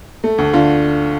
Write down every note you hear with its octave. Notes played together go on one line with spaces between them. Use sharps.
A3
D2
D3 F4